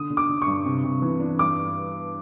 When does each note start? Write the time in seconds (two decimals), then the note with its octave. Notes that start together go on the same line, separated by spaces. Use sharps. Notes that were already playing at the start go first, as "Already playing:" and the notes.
Already playing: D3 D#6
0.10 D3
0.17 D6
0.29 D3
0.42 G2 C#6
0.65 C3
0.84 C3
1.02 E3
1.20 D4
1.39 G2 D6